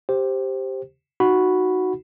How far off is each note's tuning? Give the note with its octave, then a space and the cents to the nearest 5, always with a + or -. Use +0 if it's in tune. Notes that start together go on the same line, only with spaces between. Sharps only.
G4 +0 C5 +5
D#4 +0 F#4 +0 B5 +0